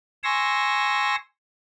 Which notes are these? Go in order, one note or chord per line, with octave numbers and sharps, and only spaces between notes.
G#5 C6 C#6 E6 A#6